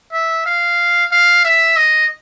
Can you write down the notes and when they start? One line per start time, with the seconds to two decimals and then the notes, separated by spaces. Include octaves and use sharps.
0.13 E5
0.46 F5
1.12 F5
1.45 E5
1.77 D#5